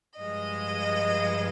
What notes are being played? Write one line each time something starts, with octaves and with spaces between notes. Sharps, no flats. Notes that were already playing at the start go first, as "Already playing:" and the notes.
G2 F3 G#3 D#5